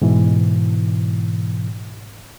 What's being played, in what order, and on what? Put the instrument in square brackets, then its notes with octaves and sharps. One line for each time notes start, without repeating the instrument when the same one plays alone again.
[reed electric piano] G#2 B2 E3